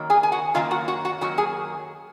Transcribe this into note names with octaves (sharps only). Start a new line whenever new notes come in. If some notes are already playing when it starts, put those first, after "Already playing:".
Already playing: F#2 D#3 F#3 A#3
G#4 G#5
G#5
F#4 F#5
F#2 D#3 F#3 A#3 F4 F5
F#4 F#5
F#4 F#5
F#4 F#5
F#2 D#3 F#3 A#3 F#4 F#5
G#4 G#5